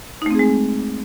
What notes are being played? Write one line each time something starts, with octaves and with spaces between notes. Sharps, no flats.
G#3 A3 C4 D#4 G#4